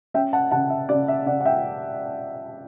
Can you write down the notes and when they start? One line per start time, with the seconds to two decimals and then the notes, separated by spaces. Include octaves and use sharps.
0.14 C#4 E5 G5
0.33 F#5 A5
0.51 C#3 F#5 A5
0.70 E5
0.89 C#3 D5
1.08 E5
1.26 C#3 D5 F#5
1.41 F#5
1.45 E5 G5